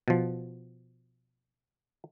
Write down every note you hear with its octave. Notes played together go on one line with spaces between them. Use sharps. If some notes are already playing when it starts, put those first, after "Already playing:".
B2 F3